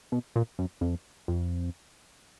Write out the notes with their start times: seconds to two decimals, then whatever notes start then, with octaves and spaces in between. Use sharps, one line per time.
0.12 B2
0.36 A#2
0.59 F#2
0.81 F2
1.28 F2